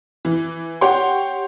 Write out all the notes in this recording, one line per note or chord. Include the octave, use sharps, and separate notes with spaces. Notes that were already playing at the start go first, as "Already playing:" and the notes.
E3
G4 C#5 F#5 C6